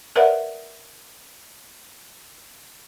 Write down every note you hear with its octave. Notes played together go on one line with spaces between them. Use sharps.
A#4 B4 C#5 D5 E5 F#5